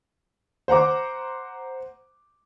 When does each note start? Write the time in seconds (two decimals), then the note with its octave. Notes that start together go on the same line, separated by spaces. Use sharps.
0.68 C5 F#5 A#5 D6